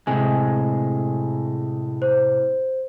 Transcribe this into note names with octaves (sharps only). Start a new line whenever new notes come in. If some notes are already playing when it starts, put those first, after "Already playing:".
A2 C3 G#3 G#5
C5